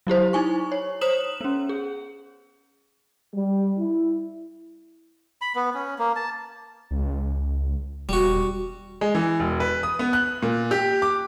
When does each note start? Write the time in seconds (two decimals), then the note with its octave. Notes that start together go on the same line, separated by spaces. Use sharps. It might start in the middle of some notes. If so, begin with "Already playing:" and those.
0.07 F#3 E4 G4 C5
0.33 D#4 E4 G#5 C#6
0.72 C#5
1.01 C5 C#5 D#6 E7 F#7
1.41 B3 C#4
1.69 G#4
3.34 G3
3.79 E4
5.41 B5
5.55 B3
5.75 C#4
5.99 A#3
6.16 A5
6.91 C#2
8.09 E1 G3 F#4
9.01 G#3
9.15 E3
9.40 E1
9.60 B4
9.83 D#6
9.99 B3
10.13 F#6
10.42 A#2
10.71 G4
11.02 D6